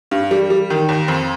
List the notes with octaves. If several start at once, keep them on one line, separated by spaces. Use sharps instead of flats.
G2
G3
G3
D#3
D#2
F2